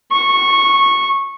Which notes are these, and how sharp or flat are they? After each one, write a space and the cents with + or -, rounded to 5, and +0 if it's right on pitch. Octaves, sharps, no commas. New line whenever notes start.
C#6 -15